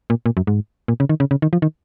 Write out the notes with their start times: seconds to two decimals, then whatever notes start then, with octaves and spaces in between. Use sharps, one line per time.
0.10 A#2
0.26 A#2
0.37 F#2
0.47 G#2
0.88 A#2
1.00 C#3
1.09 D#3
1.20 C#3
1.31 C#3
1.42 D#3
1.53 F3
1.62 D#3